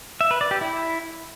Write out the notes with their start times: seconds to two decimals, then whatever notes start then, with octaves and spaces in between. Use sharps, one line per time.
0.21 E5
0.31 B4
0.41 D5
0.51 G4
0.61 E4